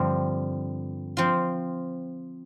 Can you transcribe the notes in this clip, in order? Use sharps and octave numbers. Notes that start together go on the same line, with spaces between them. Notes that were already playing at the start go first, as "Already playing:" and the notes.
Already playing: G2 D3 F3 C4 G4
F3 C4 F4